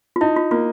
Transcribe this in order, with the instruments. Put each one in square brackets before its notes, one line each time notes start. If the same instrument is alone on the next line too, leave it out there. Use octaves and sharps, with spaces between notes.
[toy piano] F4
[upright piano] D#4 [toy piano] E4
[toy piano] F4
[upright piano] A#3 [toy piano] F4